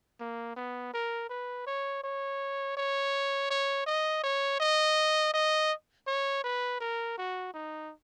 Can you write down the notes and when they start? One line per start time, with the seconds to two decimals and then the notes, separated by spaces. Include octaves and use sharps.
0.20 A#3
0.56 B3
0.93 A#4
1.29 B4
1.67 C#5
2.04 C#5
2.77 C#5
3.50 C#5
3.86 D#5
4.23 C#5
4.60 D#5
5.34 D#5
6.07 C#5
6.44 B4
6.80 A#4
7.17 F#4
7.54 D#4